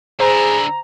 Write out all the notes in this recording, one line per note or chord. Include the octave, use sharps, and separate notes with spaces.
D3 E4 G#4 C5 A#5